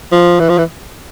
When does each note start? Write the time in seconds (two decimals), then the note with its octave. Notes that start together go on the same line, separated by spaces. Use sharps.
0.12 F3
0.40 E3
0.49 F3
0.58 E3